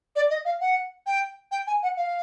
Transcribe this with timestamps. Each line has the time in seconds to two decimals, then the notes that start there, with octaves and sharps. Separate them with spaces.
0.16 D5
0.30 D#5
0.45 F5
0.61 F#5
1.06 G5
1.51 G5
1.67 G#5
1.83 F#5
1.97 F5